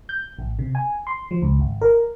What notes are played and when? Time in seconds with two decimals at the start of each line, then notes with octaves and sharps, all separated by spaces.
0.09 G6
0.39 A1
0.59 C3
0.75 G#5
1.07 C6
1.31 F3
1.42 C#2
1.59 G#1
1.81 A#4